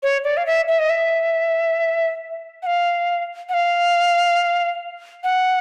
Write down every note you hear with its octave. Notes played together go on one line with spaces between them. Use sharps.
C#5
D5
F5
E5
E5
D#5
E5
F#5
F5
F#5
F5
F#5